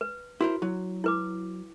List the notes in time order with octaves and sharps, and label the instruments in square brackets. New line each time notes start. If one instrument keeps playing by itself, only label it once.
[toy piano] B4
[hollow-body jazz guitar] E4 A#4 C5 [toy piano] F#4
[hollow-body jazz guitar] F#3 [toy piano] E4
[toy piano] E4 B4 D6